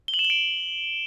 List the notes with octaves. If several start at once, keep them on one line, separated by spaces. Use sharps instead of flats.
G7
F#7
E7
G7
D7